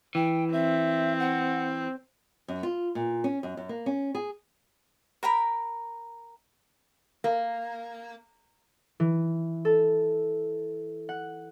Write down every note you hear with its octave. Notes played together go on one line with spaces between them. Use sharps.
E3 G5
C4 E5
F#5
F#2
F4
A#2
C#4
F#2
F#2
A#3
C#4
G#4
A#4 G5 A#5 B5
A#3
E3
A4
F#5